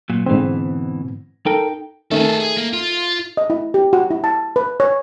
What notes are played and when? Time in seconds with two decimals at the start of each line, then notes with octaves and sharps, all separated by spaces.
0.10 A#2 F#3
0.26 G#2 B2 D3 E3 C4
1.46 D#4 A4 A#4 G5
2.12 D#3 A3 G#4 A4
2.40 G#4
2.58 A#3
2.73 F4
3.37 D#5
3.50 E4
3.74 G4
3.93 F#4
4.11 E4
4.24 A5
4.56 B4
4.80 C#5